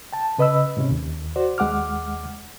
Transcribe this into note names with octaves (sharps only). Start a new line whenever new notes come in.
G5 A5
C#3 B4 D#5 B5 E6
G#2 C3 C#4
D#2
F#4 C5 D5
D#2 G#3 F#5 D6 F6